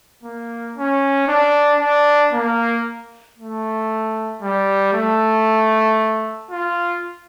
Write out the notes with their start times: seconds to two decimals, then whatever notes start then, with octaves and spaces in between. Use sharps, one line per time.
0.23 A#3
0.76 C#4
1.28 D4
1.80 D4
2.33 A#3
3.38 A3
4.42 G3
4.94 A3
6.51 F4